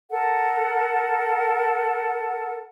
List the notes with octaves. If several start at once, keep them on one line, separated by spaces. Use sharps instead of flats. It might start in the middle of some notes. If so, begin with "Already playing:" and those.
A4 A#4 F#5